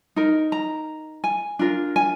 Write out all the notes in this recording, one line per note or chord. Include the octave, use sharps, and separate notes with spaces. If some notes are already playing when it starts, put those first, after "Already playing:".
D#4 A#4
A#5
G#5
D4 F4 A#4
G#5